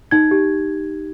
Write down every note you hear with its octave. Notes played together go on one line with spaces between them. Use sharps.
D#4 G#6
G4